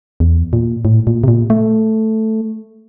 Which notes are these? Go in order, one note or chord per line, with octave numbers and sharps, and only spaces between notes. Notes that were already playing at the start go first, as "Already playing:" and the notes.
E2
A#2
A2
A#2
C3
A#2
A3